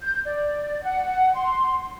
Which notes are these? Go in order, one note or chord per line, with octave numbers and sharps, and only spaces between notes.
G6
D5
F#5
C6